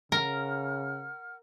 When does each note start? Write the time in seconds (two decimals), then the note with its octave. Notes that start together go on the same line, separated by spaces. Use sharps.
0.12 C#3 A#4 F#5 F6